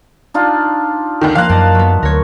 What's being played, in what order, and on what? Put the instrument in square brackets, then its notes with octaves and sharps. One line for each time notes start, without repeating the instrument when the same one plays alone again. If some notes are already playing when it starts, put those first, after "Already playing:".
[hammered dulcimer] D4 D#4 F4
[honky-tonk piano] D#2 D3 D#3
[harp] F3 A#3 [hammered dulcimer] C5 [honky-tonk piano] F5 F#6
[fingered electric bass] F#2 [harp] G4 D#5 [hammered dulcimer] A5
[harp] F#3 B3
[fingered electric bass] D2 [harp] A#4 C#5